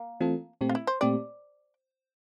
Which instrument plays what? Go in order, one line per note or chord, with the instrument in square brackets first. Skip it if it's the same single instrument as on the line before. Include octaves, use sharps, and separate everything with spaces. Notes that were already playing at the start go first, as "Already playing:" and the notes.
Already playing: [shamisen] A#3
[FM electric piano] E3 A3 C4 F4 A4
A#2 A3 C4 G4
[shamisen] F4
E4
C5
[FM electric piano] A#2 A3 C4 G4 [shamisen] D5